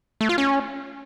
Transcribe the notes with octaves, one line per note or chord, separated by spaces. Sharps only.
A3
F4
C#4